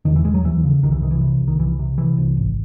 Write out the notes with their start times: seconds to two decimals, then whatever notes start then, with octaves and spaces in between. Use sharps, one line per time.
0.05 E1 D#3
0.16 E3
0.24 E1 G#3
0.34 F#3
0.44 D#2 E3
0.64 C#3
0.83 C2 D#3
0.92 E3
1.02 C3 D#3
1.11 E3
1.21 C3
1.40 C2
1.48 D#3
1.59 C2 E3
1.79 C3
1.98 C3 E3
2.17 C2
2.37 G#1